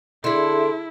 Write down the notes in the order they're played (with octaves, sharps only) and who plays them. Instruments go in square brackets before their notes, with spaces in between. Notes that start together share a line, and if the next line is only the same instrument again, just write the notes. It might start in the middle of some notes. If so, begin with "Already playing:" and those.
[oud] D3 D4 [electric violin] E4 [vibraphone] G#4 E5 C6